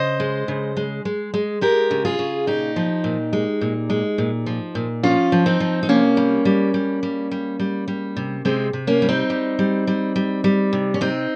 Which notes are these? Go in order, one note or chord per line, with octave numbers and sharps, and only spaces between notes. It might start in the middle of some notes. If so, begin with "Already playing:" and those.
Already playing: C#3 C5 D#5
G#3
C#3
G#3
G#3
G#3
G#3 G4 A#4
C#3
F4 G#4
C#3
A#2 D#4 G4
F3
A#2
G#3
A#2
G#3
A#2
F3
A#2
F3 C#4 F4
F3
C4 D#4
F3
D#4
C3 A#3 C#4
G3
G3
G3
G3
G3
G3
G3
C3
C3 G#3 C4
C3
A#3 C#4
G3
C4 D#4
G3
G3
G3
G3
G3
C3
C#4
C3 C4 D#4